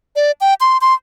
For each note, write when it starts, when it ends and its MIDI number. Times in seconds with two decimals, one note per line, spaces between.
0.16 0.31 74
0.41 0.54 79
0.61 0.78 84
0.81 0.94 84